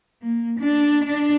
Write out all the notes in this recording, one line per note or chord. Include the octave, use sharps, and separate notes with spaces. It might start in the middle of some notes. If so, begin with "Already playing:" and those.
A#3
D4
D4